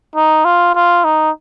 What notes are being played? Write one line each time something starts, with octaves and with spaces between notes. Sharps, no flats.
D#4
F4
F4
D#4